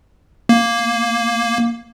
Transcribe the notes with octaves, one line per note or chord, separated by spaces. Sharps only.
A#3